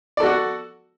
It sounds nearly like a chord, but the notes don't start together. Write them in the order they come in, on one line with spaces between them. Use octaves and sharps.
D5 A4 F#4 F#5